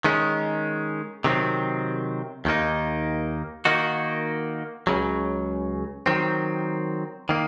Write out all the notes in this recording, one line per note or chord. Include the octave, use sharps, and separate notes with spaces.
D#3 G#3 C#4
C3 D#3 F#3 C4
D#2 D#3 A#3 D#4
D#3 A#3 D#4 F#4
C#2 C#3 F#3
D#3 F#3 C4
D#3 A#3